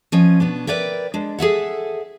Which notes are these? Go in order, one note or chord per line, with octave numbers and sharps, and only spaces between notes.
F3 C#4 D#5
B2 B3 D4
A#4 B4 D5 E5 G5
G#3 D4
G#4 A4 E5 F#5